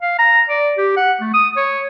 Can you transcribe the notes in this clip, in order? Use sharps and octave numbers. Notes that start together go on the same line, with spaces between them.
F5
A#5
D5
G4
F#5
A3
D#6
C#5